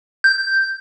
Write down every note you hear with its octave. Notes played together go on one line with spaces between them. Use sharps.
G6